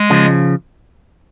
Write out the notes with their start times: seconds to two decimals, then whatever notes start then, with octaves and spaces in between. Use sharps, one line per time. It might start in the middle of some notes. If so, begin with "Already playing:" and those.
Already playing: G#3
0.10 C#3 F3